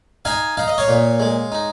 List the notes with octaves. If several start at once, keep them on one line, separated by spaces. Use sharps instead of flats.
D#4 F5 G#5
D#4 F5
D#5
C#5 F5
A#2
G#3
D#4